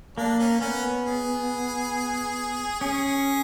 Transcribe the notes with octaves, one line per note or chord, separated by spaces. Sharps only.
A#3 D4
C#4
B3 C#4
G#4
C#4 G#4